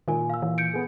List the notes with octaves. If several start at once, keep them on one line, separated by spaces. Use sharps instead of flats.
A#2 D#3 F4 A#4 G#5
F5 E6
E3
G6 C#7 D7
B3 G#4